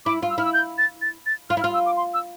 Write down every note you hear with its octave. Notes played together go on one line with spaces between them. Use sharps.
E4 D6
F4
E6
E4 F6
E6
G6
A6
A6
A6
F4 F6
E4
F6
F4
E6
D6
C6
E6